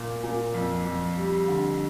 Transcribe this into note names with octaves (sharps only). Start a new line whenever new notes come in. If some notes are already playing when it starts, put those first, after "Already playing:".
Already playing: A#2
A#2
F2
F2
G3
D3